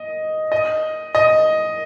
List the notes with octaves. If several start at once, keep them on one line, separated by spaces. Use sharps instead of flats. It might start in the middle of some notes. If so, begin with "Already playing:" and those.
Already playing: D#5
D#5
D#5